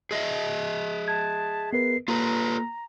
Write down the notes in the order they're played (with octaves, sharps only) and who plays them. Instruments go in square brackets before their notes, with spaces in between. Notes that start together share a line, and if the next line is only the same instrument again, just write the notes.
[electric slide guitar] G#4 D#5 E5
[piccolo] A5 [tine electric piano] G#6
[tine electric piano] B3 A#4 B4 [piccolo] C7
[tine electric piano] A#3 [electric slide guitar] F4 A4 B4 [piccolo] A#5